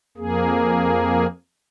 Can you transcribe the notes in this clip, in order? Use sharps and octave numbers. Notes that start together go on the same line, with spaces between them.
F2 A#3 G#4